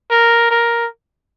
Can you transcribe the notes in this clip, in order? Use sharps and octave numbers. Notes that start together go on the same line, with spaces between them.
A#4
A#4